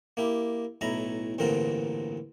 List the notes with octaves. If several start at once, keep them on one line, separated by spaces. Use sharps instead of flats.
A#3 E4 G4
B1 A2 E4 A#5 B5
A1 G2 A#2 D3 C4 A#4